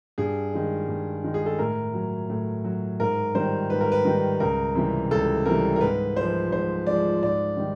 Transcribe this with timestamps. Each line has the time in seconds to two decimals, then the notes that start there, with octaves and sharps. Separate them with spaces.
0.18 G2 G#4
0.53 D#3 G#3
0.88 G2
1.24 D#3 G#3
1.34 G#4
1.46 A4
1.59 A2 A#4
1.94 F#3
2.30 A2
2.64 F#3
3.00 G#2 A#4
3.35 D#3 G3 C5
3.70 G#2 B4
3.81 A#4
3.92 B4
4.05 D#3 G3
4.40 C#2 A#4
4.75 C3 E3 G3
5.11 C#2 A4
5.46 C3 E3 G3 A#4
5.76 A#4
5.81 G#2 B4
6.16 F3 G#3 C5
6.51 G#2 C5
6.87 F3 G#3 D5
7.22 G#2 D5
7.57 D#3 G3